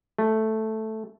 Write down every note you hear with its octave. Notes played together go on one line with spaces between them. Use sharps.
A3